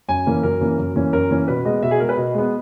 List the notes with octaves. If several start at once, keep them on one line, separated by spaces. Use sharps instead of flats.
F#2 G#5
E3 A#3 C#4
F#2 A#4
E3 A#3 C#4
F#2
E3 A#3 C#4
F#2 A#4
E3 A#3 C#4
B2 B4
G#3 B3 D#5
B2 E5
G#4
G#3 B3 A#4
B4
B2 D#5
G#3 B3